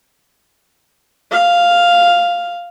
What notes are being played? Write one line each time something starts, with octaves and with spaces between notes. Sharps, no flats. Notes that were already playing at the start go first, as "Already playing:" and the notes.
F5